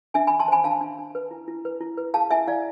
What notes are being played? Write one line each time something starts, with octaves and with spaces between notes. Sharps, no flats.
D4 E5 G#5
D4 G#5 B5
A5 C6
C5 G#5 B5
D4 F5 A5
D4
D4
B4
E4
E4
B4
E4
B4
G#4 F5 A5
E4 E5 G#5
E4 D5 F5